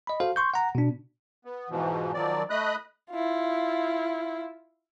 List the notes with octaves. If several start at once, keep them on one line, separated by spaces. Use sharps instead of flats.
D#5 B5
F#4 A4 C5 F5
C6 C#6 G6
F#5 A#5
B2 D4
B3
G#2 B2 E3 F3
D#3 F3 F#3 D5
A3 D#5 B5 D#6 F#6
E4 F4